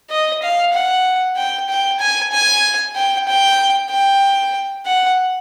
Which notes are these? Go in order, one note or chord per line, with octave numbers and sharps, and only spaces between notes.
D#5
F5
F#5
G5
G5
G#5
G#5
G5
G5
G5
F#5